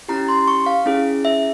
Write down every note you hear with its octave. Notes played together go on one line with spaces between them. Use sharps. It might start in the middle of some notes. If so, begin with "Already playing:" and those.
C#4 E4 G4 A#5
C6
C#6
F5
C#4 E4 G#4
E5